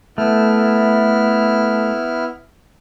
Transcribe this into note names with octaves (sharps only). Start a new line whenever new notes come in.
A3 B3 E4 F6